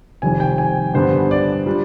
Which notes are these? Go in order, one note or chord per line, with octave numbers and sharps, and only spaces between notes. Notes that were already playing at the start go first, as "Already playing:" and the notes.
F1 F2 D#3 G3 C4 G#5
G5
G#5
G2 D3 G3 B3 D4 C5
D5
G3 D4 F4